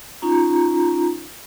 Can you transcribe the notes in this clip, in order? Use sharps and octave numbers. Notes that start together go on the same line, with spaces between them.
C#4 D#4 F4 A#5